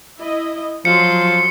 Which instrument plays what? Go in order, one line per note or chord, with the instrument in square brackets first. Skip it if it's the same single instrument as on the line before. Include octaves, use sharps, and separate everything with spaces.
[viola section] E4 D#5
[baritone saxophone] F3 [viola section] F#3 C6 [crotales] C#7